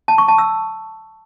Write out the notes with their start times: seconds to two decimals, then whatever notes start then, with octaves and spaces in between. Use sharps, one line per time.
0.08 A5
0.18 C#6
0.28 A5
0.38 E6